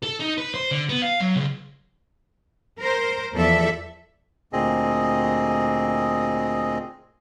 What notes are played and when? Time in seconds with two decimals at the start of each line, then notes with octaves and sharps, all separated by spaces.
0.03 A4
0.20 D#4
0.38 B4
0.54 C5
0.71 D3
0.89 B3
1.02 F5
1.20 F#3
1.36 C#2
2.79 A#4 C5
3.33 E2 F3 A4 D5 E5
4.53 D2 A#2 C4 G#4 D#5